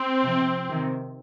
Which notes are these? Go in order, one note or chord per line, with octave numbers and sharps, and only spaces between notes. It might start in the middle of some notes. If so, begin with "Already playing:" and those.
Already playing: C4
C3 F3
C3 D#3